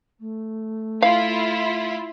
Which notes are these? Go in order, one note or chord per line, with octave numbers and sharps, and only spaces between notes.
A3
E4 F4 F5